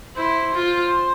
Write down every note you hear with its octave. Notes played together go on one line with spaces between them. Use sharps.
E4 C5
F4